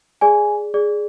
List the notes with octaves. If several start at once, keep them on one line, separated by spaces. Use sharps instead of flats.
G#4 D5 G#5
G#4 D5